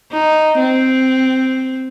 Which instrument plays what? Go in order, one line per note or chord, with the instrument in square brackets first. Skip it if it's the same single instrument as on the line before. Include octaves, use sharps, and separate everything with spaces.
[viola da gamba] D#4
C4